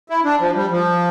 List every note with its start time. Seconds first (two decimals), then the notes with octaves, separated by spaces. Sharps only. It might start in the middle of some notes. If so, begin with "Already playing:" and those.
0.10 E4
0.25 D4
0.40 F3
0.55 G3
0.71 F3